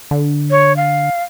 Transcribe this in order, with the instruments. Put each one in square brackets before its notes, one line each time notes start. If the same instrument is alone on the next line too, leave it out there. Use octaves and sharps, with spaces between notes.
[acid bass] D3
[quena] C#5
F5